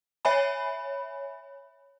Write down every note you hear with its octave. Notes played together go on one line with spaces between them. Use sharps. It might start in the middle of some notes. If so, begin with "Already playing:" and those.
C#5 E5 G#5 B5